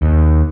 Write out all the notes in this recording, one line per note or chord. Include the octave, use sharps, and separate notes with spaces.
D#2